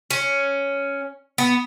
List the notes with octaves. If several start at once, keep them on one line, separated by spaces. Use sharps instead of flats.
C#4
B3